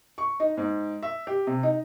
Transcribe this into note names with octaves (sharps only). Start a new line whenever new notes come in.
C#6
D#4
G#2
E5
G4
C3
D#4